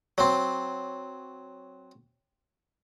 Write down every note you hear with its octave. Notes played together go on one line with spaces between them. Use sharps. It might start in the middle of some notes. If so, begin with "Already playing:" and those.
F#3 C4